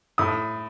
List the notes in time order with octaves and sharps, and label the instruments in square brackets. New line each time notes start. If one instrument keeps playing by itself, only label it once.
[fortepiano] A2 D#6